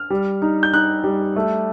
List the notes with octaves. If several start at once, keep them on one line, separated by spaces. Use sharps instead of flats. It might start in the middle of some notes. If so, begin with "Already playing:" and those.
Already playing: F6
G3
D#4
G6
D#4 F#6
G3
A3